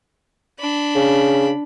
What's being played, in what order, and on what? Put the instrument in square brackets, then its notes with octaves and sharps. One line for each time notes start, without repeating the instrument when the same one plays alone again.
[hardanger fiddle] D4 B5
[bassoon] C#3